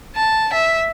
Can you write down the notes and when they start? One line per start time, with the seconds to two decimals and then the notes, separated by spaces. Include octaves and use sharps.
0.16 A5
0.54 E5